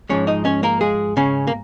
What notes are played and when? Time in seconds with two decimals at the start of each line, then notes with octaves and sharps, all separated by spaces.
0.09 G#2 F3 G#3 C#4 C#5
0.27 D#4 D#5
0.45 C#4 C#5
0.63 A#3 A#4
0.81 G#3 G#4
1.17 C#3 C#4
1.47 A#3